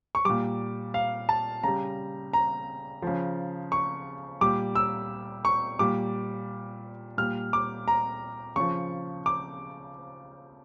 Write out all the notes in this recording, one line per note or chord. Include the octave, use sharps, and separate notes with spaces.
C#6
A#2 G3 D6
F5
A5
C#3 G3 A#5
A#5
C#3 F3
C#6
A#2 G3 D6
E6
C#6
A#2 G3 D6
A#2 G3 F6
D6
A#5
C#3 F3 C#6
D6